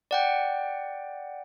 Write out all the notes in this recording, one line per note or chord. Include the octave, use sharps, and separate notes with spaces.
D5 F#5 G5